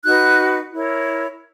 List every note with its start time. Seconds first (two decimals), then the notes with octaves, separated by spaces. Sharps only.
0.04 D#4 F#4 B4 F#6
0.71 E4 A#4 C#5